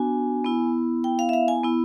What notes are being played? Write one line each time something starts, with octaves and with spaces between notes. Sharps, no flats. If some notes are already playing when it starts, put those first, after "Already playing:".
Already playing: B3 D4 F#4 G#5
B3 E4
G5
F5
E5
F5
G#5
B3 E4